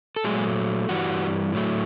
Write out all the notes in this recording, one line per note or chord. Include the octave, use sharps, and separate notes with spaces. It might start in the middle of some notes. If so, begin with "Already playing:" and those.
A4
A#2 F#3 G#3 A3 G#4
G2 E3 G3 F#4
A2 F#3 A3